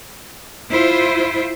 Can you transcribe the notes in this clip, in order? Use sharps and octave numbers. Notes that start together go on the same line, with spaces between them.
E4 F4 C5